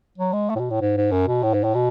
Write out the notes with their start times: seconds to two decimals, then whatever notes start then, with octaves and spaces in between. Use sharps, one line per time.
0.18 F#3
0.33 G#3
0.50 A3
0.55 A2
0.59 B2
0.70 A2
0.81 G#2
0.97 G#2
1.11 F#2
1.27 B2
1.43 A2
1.54 G#2
1.64 A2
1.74 B2